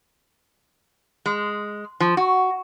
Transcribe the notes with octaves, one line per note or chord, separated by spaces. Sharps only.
G#3
F3
F#4